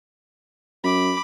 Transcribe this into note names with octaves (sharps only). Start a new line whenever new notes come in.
F#2 B5 D6